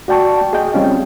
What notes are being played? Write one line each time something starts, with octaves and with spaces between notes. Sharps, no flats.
F#4 D5 G5 A5 C#6
G#4 D#5 G5
G3 C4 C#4 F4